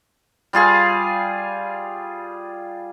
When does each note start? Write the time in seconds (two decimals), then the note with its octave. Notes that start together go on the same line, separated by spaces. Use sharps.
0.53 G3 F4 G#4 F5